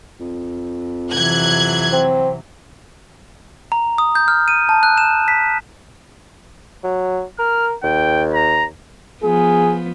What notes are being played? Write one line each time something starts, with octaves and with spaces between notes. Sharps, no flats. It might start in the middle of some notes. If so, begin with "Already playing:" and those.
F2
C3 E3 F#3 F#6 G#6
C4
A#5
D#6
G6
F6
D#7
A5
F#6
E7
B6
F#3
A#4 F6
D#2 G5
A#5
F3 B3 G#4